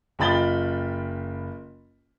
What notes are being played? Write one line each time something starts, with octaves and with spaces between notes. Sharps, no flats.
F#1 F4 G5 B5 A6 G7